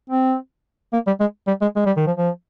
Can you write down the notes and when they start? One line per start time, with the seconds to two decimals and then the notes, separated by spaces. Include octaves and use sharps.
0.10 C4
0.93 A#3
1.07 G3
1.20 G#3
1.48 G3
1.62 G#3
1.76 G#3
1.87 G3
1.97 D#3
2.07 F3
2.17 F3